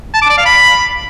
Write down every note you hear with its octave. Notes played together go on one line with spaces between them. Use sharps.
A5
D6
D5
F5
B5